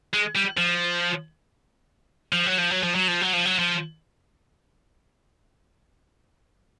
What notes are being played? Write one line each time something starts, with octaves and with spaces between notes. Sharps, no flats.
G#3
G3
F3
F3
F#3
F3
F#3
F3
F#3
F3
F#3
F3
F#3
F3